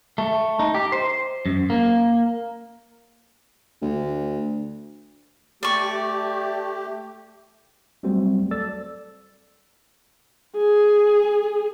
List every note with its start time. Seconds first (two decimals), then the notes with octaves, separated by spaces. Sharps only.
0.18 A3
0.59 D#4
0.75 G4
0.92 C5
1.46 F#2
1.70 A#3
3.82 D2
5.63 A3 G4 D5 C#6
8.03 F#3 G3 A3 C4 F#4 C5
8.51 A4 D5 E6 A6
10.57 G#4